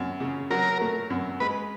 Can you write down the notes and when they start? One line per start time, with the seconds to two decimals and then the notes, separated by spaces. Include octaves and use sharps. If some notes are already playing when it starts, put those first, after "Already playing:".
Already playing: F#2
0.20 C#3
0.50 F#3 A#4
0.81 A3
1.10 F#2
1.40 G#3 B4